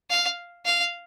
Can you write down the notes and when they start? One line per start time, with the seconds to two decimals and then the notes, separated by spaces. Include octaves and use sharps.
0.10 F5
0.65 F5